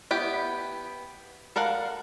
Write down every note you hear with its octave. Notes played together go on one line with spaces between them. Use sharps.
B3 E4 G4
A4 A#4 F5 F#5